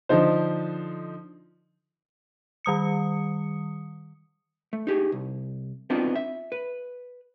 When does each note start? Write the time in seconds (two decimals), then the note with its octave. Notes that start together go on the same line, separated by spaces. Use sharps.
0.09 D3 F3 D#4 C5
2.65 D#3 G3 D#6 C#7
4.73 A3
4.87 D#4 G4 G#4
5.12 C2
5.90 B3 C4 D4 D#4 F4 F#4
6.15 E5
6.52 B4